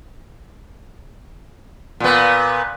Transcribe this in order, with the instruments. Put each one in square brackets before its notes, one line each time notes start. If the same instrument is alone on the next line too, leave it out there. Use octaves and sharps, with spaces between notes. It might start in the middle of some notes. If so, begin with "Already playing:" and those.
[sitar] A#2 B3